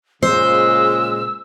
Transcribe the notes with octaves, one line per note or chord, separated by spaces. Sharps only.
A#2 C#3 G#3 C5 E6